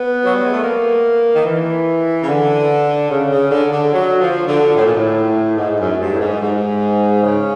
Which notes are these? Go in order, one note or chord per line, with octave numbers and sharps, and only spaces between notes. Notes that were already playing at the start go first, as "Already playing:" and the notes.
Already playing: B3
F#3
G3
G#3
A3
A#3
D#3
E3
C#3
D3
C#3
C#3
D3
D3
F#3
F3
D3
A2
A#2
A2
G#2
F#2
G2
A2
G#2
G#2
C#3